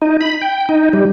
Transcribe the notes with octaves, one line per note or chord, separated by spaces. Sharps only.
D#4
B5
G5
D#4
G3